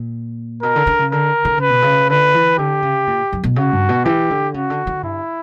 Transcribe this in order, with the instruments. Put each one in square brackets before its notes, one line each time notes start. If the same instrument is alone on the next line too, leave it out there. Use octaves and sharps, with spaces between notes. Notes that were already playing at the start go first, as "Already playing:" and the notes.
Already playing: [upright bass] A#2
[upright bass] B2 [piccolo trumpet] A#4
[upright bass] D3
D3
C#3
[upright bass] D3 [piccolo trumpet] A#4
[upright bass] D3
[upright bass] C#3 [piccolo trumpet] B4
[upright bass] B2
C#3
[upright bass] D3 [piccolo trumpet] B4
[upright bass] E3
[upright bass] D3 [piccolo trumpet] G4
[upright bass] C#3
A#2
F#2
B2
[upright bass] C#3 [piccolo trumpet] F#4
[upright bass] G2
B2
[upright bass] E3 [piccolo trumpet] G4
[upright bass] D3
[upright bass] C#3 [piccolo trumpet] F#4
[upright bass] D3
D3
[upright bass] G2 [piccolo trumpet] E4